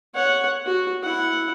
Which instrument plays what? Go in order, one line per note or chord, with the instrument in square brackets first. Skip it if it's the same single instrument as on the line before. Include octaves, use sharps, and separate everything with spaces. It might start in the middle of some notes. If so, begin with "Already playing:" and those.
[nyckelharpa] C#5 F#5
F#4
E4 F#5